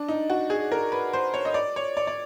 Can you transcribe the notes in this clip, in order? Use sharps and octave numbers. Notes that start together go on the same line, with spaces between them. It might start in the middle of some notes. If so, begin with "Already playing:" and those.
Already playing: D4
D#4
F#4
G#4
A#4
B4
C5
C#5
D#5
D5
C#5
D5
D5